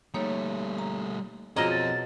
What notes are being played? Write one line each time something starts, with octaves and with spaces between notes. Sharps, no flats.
G3 A3 A#3 D#4 C#5
A#5
B2 F3 F#3 C4 F4 G#4 D#5 A#5
A6